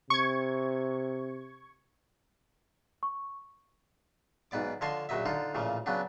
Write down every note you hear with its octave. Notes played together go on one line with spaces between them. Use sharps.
C3 C#6 G#6
C#6
B1 G#2 B3 D5 D6
D3 F3 C#5 D#5 A5 C6
A#1 F#2 F#3 D#5 E5
D3 D4 D#4 F4
A1 A#2 C#3 F3
C#3 F#3 B3 D4